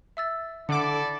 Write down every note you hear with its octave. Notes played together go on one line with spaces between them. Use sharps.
E5 E6 A6
D3 E4 A4 D5 F#5 D6